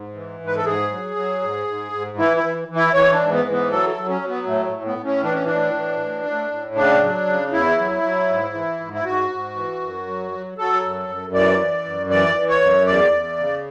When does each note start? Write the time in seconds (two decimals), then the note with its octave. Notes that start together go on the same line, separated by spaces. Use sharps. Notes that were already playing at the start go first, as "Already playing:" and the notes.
Already playing: G#2
0.14 E3
0.40 G#2
0.46 B4
0.56 A4
0.65 G#2 G#4
0.91 F#3
1.16 F#3
1.42 G#2
1.68 G#2
1.92 G#2
2.18 E3 E4
2.37 E4
2.43 E3
2.68 E3
2.75 E4
2.94 E3 C#5
3.13 D4
3.20 G#2
3.32 B3
3.45 E3
3.51 B3
3.70 F#3 A4
3.90 A4
3.96 F#3
4.09 C#4
4.22 F#3
4.28 B3
4.47 A2 A3
4.66 A3
4.72 A2
4.85 B3
4.98 A2
5.04 C#4
5.23 E3 D4
5.34 C#4
5.45 A2 D4
5.74 E3
5.99 A2
6.26 A2
6.51 A2
6.75 C#3 D4
7.02 F#3
7.27 C#3
7.52 E2 E4
7.78 F#3
8.03 F#3
8.29 G#2
8.55 E3
8.80 G#2
8.93 E4
9.05 G#2 F#4
9.31 G#2
9.56 E3
9.81 F#2
10.07 F#3
10.31 F#3
10.58 F#3 A4
10.83 F#2
11.08 F#2
11.34 E3 D5
11.59 E3
11.85 F#2
12.10 E3 D5
12.36 E3
12.48 C#5
12.61 F#2
12.86 E2 D5
13.12 E2
13.38 C#3